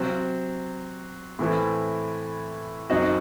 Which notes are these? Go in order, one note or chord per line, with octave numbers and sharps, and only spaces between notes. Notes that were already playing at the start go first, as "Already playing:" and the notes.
Already playing: C3 F#3 C4
A2 E3 A3 C4 E4
F#2 F#3 C4 D#4 F#4